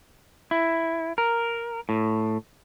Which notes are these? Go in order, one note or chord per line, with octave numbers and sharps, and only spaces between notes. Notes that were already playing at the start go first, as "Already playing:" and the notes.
E4
A#4
A2